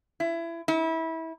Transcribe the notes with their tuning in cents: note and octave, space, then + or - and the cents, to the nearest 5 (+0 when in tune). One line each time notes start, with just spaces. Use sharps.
E4 +25
E4 -25